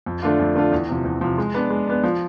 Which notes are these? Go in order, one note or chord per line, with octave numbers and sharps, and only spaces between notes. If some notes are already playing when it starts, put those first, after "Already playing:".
F2
D3 A3 D4 F4
F2
D3 A3 D4 F4
E2
C3 F3
E2
C3 F3
G#3
B3 D4
G#3
B3 D4
F3